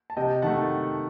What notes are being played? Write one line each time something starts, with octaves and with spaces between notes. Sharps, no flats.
A5
C3 D#5 G5
D#3 A3 F#5 A5